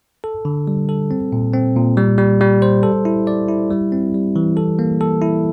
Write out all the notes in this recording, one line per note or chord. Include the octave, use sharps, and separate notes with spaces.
A4
D3
G3
A4
C4
A#2
C4
A#2
G3
G3
G3
C5
A4
E4
D5
E4
G3
C4
G3
E3
A4
A#3
A4
E4